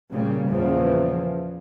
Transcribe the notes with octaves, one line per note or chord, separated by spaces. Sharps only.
A#2 C#3 G3
E2 A#2 C#3 F3